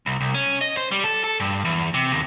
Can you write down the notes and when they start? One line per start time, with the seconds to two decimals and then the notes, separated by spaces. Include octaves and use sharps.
0.06 C2
0.21 C2
0.34 C#4
0.61 D#5
0.77 C5
0.91 G3
1.04 A4
1.24 A4
1.40 G2
1.65 E2
1.94 C3
2.12 D#2